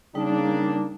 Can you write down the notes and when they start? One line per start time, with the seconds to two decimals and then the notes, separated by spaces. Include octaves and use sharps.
0.15 C#3 G3 A#3 D4 D#4